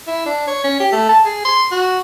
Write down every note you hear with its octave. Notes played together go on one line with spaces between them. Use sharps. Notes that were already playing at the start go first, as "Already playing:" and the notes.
E4
D4
C#5
C#4
G4
A3
A5
G#4
C6
F#4